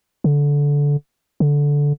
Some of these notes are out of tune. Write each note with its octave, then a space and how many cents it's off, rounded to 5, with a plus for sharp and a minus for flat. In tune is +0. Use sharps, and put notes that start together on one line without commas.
D3 -20
D3 -15